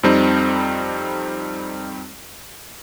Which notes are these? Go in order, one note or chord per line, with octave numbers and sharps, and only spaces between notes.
F2 G3 C4 D#4